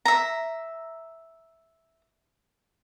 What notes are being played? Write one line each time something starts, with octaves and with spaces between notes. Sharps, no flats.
E5 A#5